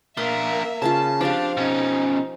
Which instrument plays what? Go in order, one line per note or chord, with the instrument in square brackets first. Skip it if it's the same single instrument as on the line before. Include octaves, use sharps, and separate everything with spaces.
[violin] A#3 E5 [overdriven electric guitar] D4 A#4 [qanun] C6
[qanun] C#3 C#4 F4 [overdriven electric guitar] A5
[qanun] F3 C4 G4 [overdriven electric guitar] D4 [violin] F5
[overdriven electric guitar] B2 C#4 [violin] D#4